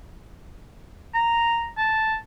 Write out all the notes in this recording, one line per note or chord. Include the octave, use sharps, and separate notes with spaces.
A#5
A5